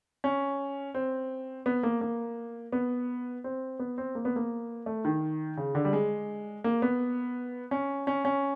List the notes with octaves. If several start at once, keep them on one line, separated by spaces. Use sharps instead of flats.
C#4
C4
B3
A#3
A#3
B3
C4
B3
C4
A#3
B3
A#3
A3
D#3
C#3
D3
G3
G#3
A#3
B3
C#4
C#4
C#4